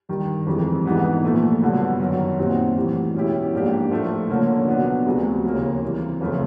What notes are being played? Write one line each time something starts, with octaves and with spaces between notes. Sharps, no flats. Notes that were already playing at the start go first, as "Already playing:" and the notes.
G2 D#3 G3
F2 C3 E3 G#3
G#2 E3 G3 B3 D#4
A#2 F3 A3
G2 D3 F#3 B3 D4
F#2 D#3 F#3
A#2 G3 C4 D#4 F#4
A2 E3 G3
B2 G#3 C#4 E4 G4
G#2 F3 A#3 D4 G4
A2 F3 A3
D3 F3 A#3 C#4
B2 F#3 B3 D4 F#4
D2 C3 F3 G#3
D#2 C#3 F3 A#3
C3 E3 G3
F2 C#3 F3 A3 C4